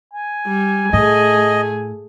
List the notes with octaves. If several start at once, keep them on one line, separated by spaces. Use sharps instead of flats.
G#5
G3
A2 A3 G#4 D#5